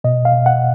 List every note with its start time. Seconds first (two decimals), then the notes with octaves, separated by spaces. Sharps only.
0.04 B2 D#5
0.25 F5
0.32 B2
0.46 F#5